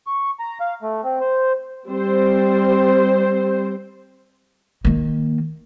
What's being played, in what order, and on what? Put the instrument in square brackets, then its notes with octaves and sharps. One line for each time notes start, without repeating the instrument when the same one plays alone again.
[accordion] C#6
A#5
F5
A3
C4
C5
[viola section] G3 C4 C5
[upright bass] D#3 A#3